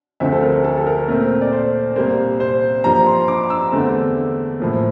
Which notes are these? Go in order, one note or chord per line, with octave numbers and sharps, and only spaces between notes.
D2 D3 F3 A3 C4 E5
A4
A#4
A4
A4
A#4
A#2 A3 C4 A#4
D5
C5
C2 A#2 G3 A#3 C5
C5
G2 F3 A#3 A#5
C6
D6
E6
E2 D3 A3 C4
A2 F3 A#3